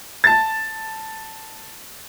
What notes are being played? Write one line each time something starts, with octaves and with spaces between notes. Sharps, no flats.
A5 A6